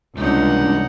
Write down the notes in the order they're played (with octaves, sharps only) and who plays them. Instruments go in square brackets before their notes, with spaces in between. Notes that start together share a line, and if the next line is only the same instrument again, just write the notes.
[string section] C#2 [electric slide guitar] C3 G3 A#3 [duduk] D4 [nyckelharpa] D#4 F#5